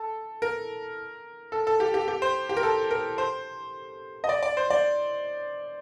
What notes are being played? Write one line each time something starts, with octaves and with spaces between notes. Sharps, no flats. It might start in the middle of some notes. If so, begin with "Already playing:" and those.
Already playing: A4
A#4
A4
A4
G4
G4
G4
C5
G4
A#4
A4
A#4
C5
D#5
D5
D5
C5
D5